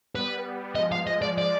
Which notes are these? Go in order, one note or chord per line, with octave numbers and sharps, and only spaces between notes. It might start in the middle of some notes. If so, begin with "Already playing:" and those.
G3 B3 B4
F3 G#3 D#5
F5
F3 G#3 D#5
D5
D5